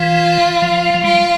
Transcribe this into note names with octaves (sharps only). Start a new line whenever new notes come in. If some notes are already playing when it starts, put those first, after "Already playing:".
Already playing: E3 F4
F3
F3
G3 F4